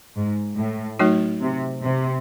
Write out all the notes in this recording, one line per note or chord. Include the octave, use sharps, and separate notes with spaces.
G#2
A2
F#3 A3 D#4 F#4 C#5
C3
C3